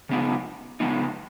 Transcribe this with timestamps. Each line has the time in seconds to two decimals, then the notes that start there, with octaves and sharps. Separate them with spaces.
0.09 C#3 G#3 B3 D#4
0.80 C#3 G#3 B3 D#4